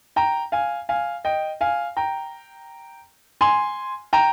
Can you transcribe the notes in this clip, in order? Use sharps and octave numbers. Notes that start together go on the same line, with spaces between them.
G5 A#5
F5 G#5
F5 G#5
D#5 G5
F5 G#5
G5 A#5
G#5 C6
G5 A#5